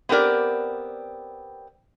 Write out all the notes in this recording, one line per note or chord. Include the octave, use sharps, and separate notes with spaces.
B3 C4 G4 A#4 D5